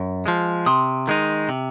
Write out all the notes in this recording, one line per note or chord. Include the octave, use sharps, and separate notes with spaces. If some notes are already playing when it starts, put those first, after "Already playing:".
Already playing: F#2
F3 G#3
C3 C6 D#6
D#3 G#3 D#4
C3